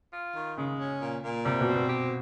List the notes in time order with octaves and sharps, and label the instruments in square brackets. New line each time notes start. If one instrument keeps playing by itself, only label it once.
[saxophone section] F4
D#3
[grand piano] C#3 [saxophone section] G#3
[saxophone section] C#4
A#2
A#2
[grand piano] C3 [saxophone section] G3
[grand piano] B2
[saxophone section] C4
[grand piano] B2
[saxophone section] G4